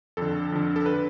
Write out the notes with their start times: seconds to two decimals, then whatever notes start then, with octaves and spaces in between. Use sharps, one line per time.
0.17 F2 D3 A4
0.52 F2 D3
0.76 A4
0.86 D3 B4